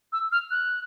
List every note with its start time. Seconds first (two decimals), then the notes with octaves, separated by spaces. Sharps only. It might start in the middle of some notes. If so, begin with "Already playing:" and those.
0.13 E6
0.32 F6
0.51 F#6